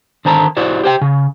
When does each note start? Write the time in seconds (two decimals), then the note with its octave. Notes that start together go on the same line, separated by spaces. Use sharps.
0.25 D3 D#3 C5 A5 A#5
0.57 E4 F#4 C5 D5
0.83 G4 C5 G5
1.01 C#3